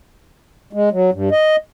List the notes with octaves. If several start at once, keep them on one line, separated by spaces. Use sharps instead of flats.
G#3
F#3
G2
D#5